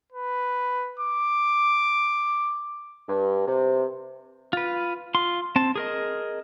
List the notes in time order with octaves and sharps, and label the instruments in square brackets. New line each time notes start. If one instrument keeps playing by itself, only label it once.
[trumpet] B4
D6
[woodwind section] G2
C3
[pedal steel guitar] F4 B4
F4 C6
C4 A5
G#4 A#4 D#5